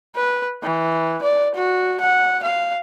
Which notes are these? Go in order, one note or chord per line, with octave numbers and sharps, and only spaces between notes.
B4
E3
D5
F#4
F#5
F5